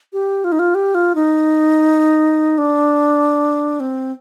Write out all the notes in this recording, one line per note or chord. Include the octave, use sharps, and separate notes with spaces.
G4
F4
D#4
F4
G4
F4
D#4
D4
C4